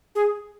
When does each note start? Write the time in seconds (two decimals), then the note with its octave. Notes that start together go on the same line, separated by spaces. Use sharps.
0.15 G#4